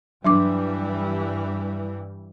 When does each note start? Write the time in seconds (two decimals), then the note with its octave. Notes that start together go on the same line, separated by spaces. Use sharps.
0.24 G2 E3 F#3 G3 D4 D6